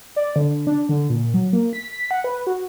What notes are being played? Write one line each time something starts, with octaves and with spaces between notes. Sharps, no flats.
D5
D3
D4
D3
A#2
F#3
A#3
B6
B6
F#5
B4
F#4